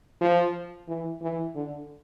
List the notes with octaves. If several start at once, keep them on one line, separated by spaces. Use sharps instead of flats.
F3
E3
E3
D3